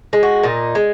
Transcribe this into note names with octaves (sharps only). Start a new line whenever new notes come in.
G#3
F#4
A#2 D#4
G#3